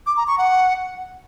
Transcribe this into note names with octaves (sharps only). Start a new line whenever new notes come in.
D6
A#5
C#6
F#5